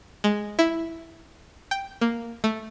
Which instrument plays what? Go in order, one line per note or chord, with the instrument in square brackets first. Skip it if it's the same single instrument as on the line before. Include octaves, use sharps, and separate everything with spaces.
[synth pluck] G#3
E4
G5
A#3
A3